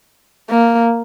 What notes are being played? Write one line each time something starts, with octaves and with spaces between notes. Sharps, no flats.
A#3